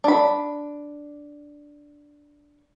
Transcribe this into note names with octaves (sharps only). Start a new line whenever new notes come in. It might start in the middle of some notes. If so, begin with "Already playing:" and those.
D4 B5